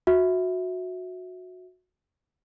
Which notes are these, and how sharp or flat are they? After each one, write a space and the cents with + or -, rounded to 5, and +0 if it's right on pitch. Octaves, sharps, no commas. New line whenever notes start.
F#4 -20 E5 -10